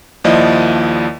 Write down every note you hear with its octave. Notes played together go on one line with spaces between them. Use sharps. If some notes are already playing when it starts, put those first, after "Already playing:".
D#2 F3 E4 D5 D#5